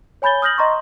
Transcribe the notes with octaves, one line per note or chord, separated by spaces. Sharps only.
C#5 G#5 B5 G6 A6 G7
D#6 F6 G6 A#6 F#7
D#5 A#5 C6 C#6